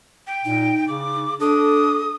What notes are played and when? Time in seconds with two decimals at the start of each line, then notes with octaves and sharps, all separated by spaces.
0.27 G5
0.45 A#2 D#4
0.88 C#3 D6
1.40 D4 A4 D#6